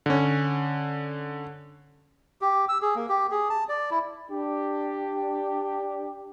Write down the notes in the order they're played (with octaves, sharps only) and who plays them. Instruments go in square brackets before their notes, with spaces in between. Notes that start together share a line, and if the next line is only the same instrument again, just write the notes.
[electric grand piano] D3 C#4
[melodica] G4
E6
G#4
A#3
G4
G#4
A5
D5
E4
[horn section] D4 G4